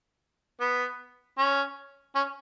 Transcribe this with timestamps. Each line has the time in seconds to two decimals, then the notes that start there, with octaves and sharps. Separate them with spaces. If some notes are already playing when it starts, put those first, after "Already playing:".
0.61 B3
1.38 C#4
2.15 C#4